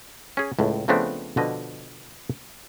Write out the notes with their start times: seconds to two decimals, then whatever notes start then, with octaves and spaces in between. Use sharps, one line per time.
0.37 C#4 G#4
0.59 C#2 A2
0.88 C#3 F3 A3 B3 C4 D4
1.37 B2 D3 F3 D#5